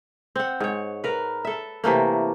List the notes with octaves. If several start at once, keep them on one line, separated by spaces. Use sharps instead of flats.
C4 F#5
G#2 C#5
A#4 B4
A4 E5
C3 E3 A3 A#3